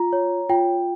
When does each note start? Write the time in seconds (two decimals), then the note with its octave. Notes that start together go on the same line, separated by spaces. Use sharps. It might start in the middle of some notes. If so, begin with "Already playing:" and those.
Already playing: F4 A#5
0.13 C#5
0.49 F4 G5